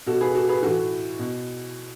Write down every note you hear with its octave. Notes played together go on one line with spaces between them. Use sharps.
B2 F#4 A4
G#4 B4
F#4 A4
G#4 B4
A2 E3 F#4 A4
B2